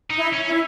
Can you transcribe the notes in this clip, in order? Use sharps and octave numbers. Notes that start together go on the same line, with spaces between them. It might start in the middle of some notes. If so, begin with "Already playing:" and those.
D#4
E4
C#4
E4